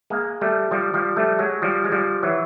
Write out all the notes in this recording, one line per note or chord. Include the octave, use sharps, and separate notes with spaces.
G#3 A#3
G3 A3
F3 G3
F3 G3
G3 A3
F#3 G#3
F3 G3
G#3
F3 G3
E3 F#3